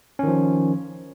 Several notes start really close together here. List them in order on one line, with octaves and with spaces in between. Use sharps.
C#4 D#3 F3